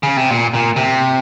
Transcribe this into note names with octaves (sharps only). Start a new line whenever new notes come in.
C#3
C3
A#2
A#2
C3